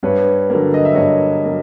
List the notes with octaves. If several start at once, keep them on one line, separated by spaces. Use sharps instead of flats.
G2 B4 C#5
D3 F#3 A#3
D#5
E5
G2 C#5 D#5
F#3 A#3